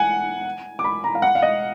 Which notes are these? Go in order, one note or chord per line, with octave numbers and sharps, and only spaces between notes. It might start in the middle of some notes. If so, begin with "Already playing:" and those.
Already playing: F#5 G#5
D6
B5
A#5
F5
F#5
F5
D#5